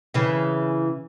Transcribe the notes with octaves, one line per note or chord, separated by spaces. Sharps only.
C#3 E3